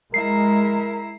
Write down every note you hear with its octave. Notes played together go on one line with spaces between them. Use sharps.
G#3 E4 A#4 A#5 C7